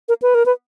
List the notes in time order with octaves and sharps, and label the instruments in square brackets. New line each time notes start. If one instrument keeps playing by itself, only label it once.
[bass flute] A#4
B4
A#4
B4